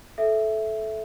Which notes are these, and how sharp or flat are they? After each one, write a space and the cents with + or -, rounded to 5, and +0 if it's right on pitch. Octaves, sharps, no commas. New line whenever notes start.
A4 -20 E5 +0